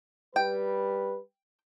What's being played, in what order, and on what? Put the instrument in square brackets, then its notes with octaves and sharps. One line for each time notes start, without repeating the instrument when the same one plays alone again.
[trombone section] G3 B4 [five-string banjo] G5